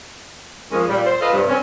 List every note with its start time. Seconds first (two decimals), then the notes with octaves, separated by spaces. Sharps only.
0.72 F2 D#3 F3 G#3 A#3 C#4
0.88 A#2 G3
1.06 C5
1.21 F4 A4 B4 D#5 F5
1.33 G2 C3
1.49 C4 C#4